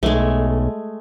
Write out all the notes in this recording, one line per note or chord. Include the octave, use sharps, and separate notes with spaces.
B1 G#3 A3